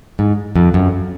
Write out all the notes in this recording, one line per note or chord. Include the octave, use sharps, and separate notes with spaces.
G#2
F2
F#2